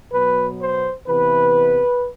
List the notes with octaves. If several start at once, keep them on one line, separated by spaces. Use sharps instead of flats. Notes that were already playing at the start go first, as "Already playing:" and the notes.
B2 F#3 B3 B4
C5
C3 E3 B3 B4